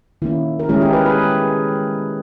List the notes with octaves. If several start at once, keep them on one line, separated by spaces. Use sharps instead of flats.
D#3 A#3 C#4 E4
A#4
D#3 G#3 C#4 E4 G#4
G4 A#4
G#4 B4
G#4 B4